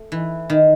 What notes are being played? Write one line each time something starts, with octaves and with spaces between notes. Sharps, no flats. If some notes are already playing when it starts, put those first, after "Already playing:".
Already playing: A3
E3
D#3